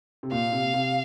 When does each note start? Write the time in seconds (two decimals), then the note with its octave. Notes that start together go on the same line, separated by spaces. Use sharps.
0.23 C3
0.32 A#2 F5
0.52 C3
0.74 C3